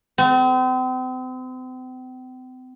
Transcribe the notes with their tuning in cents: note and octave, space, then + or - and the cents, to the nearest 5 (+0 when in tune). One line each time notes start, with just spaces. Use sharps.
C4 -40